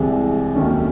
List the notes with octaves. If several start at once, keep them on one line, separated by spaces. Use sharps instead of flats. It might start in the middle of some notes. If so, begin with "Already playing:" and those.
Already playing: C2 C3 E3 G#3
D#2 D#3 F#3 A3 C#4